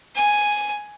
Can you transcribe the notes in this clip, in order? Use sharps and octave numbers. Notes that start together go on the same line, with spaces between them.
G#5